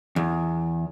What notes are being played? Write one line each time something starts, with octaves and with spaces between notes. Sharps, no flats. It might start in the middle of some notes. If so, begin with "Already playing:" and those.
E2